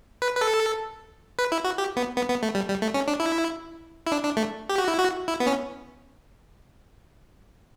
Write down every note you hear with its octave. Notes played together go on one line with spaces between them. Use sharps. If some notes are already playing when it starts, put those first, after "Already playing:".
B4
B4
A4
B4
E4
F#4
G4
B3
B3
B3
A3
G3
G3
A3
C#4
D4
E4
E4
D4
D4
A3
G4
F#4
E4
F#4
E4
B3
C#4